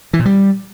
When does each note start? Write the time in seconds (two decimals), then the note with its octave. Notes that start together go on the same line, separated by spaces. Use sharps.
0.13 E3
0.19 A#2
0.25 G3